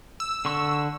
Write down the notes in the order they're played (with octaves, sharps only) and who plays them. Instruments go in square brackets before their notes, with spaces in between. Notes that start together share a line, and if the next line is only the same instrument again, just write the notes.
[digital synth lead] E6
[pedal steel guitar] D3 C#6